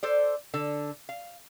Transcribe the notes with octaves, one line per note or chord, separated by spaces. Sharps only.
A4 C5 D5
D3 A4
F5